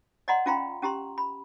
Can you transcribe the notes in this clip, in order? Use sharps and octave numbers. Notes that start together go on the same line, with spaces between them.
D5 D#5 F#5 A#5 C6
C#4 F4 F5 G5 A#5 C6
C#4 G4 A#5 C6
B5